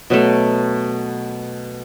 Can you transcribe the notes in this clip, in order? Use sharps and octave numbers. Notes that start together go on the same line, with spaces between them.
B2 F#3 A3